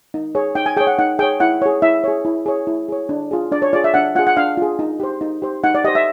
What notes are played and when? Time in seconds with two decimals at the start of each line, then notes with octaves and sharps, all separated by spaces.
0.14 D#4
0.35 G#4 C#5
0.55 D#4 G5
0.66 G#5
0.76 G#4 G5
0.81 C#5
0.87 F#5
0.99 D#4 F#5
1.19 G#4 C#5 G5
1.40 E4 F#5
1.62 G#4 C#5
1.82 E4 E5
2.04 G#4 C#5
2.25 E4
2.46 G#4 C#5
2.67 E4
2.89 G#4 C#5
3.09 D4
3.31 F4 G#4
3.52 D4 D5
3.62 C#5
3.73 F4 G#4 D5
3.84 E5
3.94 D4 F#5
4.15 F4 F#5
4.19 G#4
4.27 F#5
4.37 D4 F5
4.57 F4 G#4
4.79 D#4
5.00 G4 C5
5.21 D#4
5.42 G4 C5
5.64 D#4 F#5
5.75 D5
5.84 G4 D#5
5.88 C5
5.95 E5